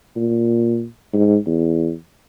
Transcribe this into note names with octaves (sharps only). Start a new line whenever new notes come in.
A#2
G#2
E2